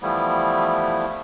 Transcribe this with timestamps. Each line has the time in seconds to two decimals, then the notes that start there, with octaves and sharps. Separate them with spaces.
0.02 E3 F3 G3 A3 B3 E4